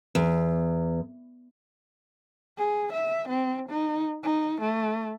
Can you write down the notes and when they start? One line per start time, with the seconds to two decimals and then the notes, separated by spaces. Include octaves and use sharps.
0.15 E2
2.57 G#4
2.93 E5
3.28 C4
3.69 D#4
4.23 D#4
4.61 A3